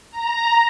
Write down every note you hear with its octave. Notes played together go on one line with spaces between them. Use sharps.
A#5